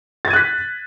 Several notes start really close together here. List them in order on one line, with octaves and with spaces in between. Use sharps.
A6 G#6 D#7 F#6 B6